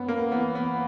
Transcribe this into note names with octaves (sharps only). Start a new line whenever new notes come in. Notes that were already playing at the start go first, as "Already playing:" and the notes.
Already playing: F#2 B3
A#3
E3 B3
B3